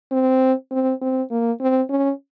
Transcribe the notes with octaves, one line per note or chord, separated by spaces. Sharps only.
C4
C4
C4
A#3
C4
C#4